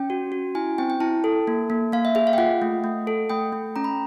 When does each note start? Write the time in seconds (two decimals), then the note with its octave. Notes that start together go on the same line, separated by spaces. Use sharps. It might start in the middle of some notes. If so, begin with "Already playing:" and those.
Already playing: C#4 G5
0.10 F#4
0.32 F#4
0.55 E4 G#5
0.78 C4 G5
0.90 G5
1.00 E4 A5
1.24 A4
1.47 A#3
1.70 A#3
1.92 A#3 F5
2.05 E5
2.15 G#4 E5
2.27 F5
2.33 G5
2.38 F4 F#5
2.62 A3
2.84 A3
3.07 A4
3.30 A3 G5
3.53 A3
3.76 C#4 A#5
3.84 B5